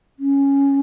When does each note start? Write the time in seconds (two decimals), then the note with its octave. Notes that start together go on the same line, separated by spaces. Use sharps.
0.19 C#4